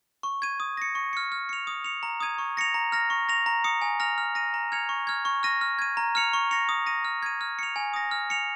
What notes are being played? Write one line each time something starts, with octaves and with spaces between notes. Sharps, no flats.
C#6
G#6 D#7
D#6
A#6 C#7
C#6
F6 C#7
F6
C#7 F7
D#6
C#7 F7
A#5
D#6 G#6 D#7
C#6
A#6 C#7 F7
A#5
F6 A#6
C#6
A#6 F7
A#5
D#6 C#7
G#5
F6 A#6 F7
F6
A#6 D#7
A#5
F6 G#6 C#7 F7
C#6
F6 G#6
C#6
F6 A#6 D#7
F6
G#6 D#7
A#5
F6 C#7 F7
C#6
A#6 C#7 F7
D#6
A#6 D#7
F6
G#6 D#7
F6
C#7 F7
G#5
D#6 A#6
F6
C#7 F7